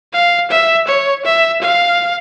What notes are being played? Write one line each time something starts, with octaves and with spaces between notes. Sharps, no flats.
F5
E5
C#5
E5
F5